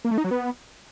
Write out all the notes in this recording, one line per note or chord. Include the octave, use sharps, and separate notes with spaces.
A#3
A3
D#4
F#3
B3